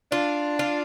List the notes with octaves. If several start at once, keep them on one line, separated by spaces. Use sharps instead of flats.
D4 F4
F4